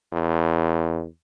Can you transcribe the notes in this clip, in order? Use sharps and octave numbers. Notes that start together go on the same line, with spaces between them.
E2